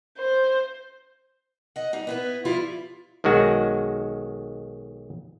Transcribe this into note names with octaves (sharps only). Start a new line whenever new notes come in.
C5
D#5 F#5
G3 D#4
B3 E4 B4
F3 G3 E4 F4
B1 D#3 G#3 F#4